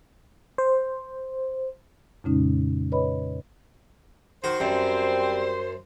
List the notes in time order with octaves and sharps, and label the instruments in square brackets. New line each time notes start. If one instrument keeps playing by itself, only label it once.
[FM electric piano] C5
[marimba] F2 A#2 C#3 G#3 C#4 D#4
B4 C#5 D#5 B5
[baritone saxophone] D#3 [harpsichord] F#4 [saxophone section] C5
[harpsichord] F#2 [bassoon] G3 [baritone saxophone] C4